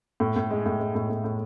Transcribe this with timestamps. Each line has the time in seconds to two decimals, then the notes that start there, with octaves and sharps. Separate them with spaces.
0.20 A2
0.36 A2
0.51 G#3
0.66 A2
0.80 G#3
0.95 A2
1.10 A2
1.24 A2